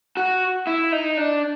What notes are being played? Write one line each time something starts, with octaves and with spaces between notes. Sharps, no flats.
F#4
E4
D#4
D4